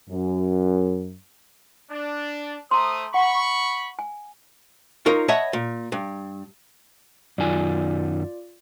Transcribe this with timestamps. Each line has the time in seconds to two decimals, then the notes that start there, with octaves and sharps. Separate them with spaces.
0.10 F#2
1.90 D4
2.71 A3 C5 A#5 C6 D#6
3.14 F#5 B5 C#6
3.99 G#5
5.06 D#4 F4 A#4 C#5
5.28 C#5 D#5 E5 F#5 A5 B5
5.53 A#2
5.92 G2
7.38 F#2 D#3 F4 D5 G#5